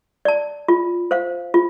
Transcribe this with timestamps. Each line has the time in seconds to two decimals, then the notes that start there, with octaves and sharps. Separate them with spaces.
0.25 D5 A5
0.68 F4
1.11 C5 F5
1.54 F4